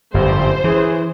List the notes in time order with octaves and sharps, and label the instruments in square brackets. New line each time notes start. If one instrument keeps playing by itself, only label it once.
[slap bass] G1 F#2 A2 [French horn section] F3 G3 G4 [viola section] C5
[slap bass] E3 [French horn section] C#4 G#4